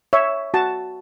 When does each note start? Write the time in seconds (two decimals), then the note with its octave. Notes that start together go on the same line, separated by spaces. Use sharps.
0.13 C#5 E5
0.54 F#4 A5